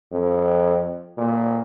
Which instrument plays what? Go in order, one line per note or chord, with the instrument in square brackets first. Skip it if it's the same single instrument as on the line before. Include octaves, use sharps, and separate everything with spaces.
[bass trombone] F2
A#2